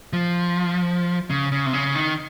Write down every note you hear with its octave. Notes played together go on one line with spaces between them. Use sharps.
F3
C#3
C#3
C3
C#3
D#3